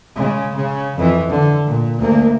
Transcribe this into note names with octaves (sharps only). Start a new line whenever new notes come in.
C#3 G#3
C#3
F2 E3
D3
A#2
D2 A#3